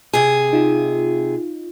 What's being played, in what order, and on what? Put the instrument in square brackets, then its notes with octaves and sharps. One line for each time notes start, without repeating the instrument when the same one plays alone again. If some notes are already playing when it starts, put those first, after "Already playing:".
[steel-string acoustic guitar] C3 G#4
[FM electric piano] D#4 F4